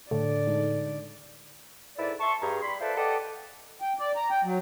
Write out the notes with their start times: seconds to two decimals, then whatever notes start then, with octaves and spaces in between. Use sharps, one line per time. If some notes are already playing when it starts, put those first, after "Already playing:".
0.11 A2 D3 A4 D5
0.47 G#3 D#4 A4
1.97 G#2 E4 A4 B4 D5
2.20 E5 A5 C6 C#6
2.41 G2 G#4 A#5
2.62 G3 B5 C6
2.80 F4 A4 B4 C5 D5 E5
2.97 G4 A4 B4 D5 D#5 F#5
3.81 G5
3.99 D5
4.16 A#5
4.30 G5
4.44 F#3